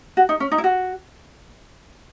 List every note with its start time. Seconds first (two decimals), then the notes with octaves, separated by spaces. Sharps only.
0.17 F#4
0.29 D#4
0.40 C#4
0.52 D#4
0.58 E4
0.64 F#4